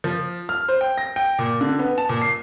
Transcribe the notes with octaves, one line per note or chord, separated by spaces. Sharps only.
F3
F6
C5
G5
A#6
G5
A#2
D3
B3
A5
A#2
C7